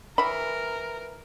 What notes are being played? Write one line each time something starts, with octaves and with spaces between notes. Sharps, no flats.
E3 A#4 B5